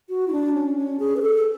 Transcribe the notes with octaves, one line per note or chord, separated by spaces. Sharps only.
F#4
E4
D4
C#4
C#4
G#4
B4
A4